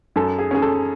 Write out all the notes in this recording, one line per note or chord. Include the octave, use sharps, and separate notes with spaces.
F#2 A4
G#4
C#4 G#4
A4